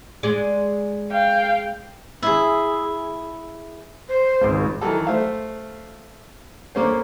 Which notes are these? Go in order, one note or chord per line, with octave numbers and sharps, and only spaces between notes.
G#3 G#4 D5
F5 G5
E4 G#4
C5
G#1 C#2
D#3 E3 F#3 A4
A3 C5 E5 F5
D3 A#3 C#4 C5